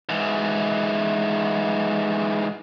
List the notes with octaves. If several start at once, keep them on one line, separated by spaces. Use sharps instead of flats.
G#2 E3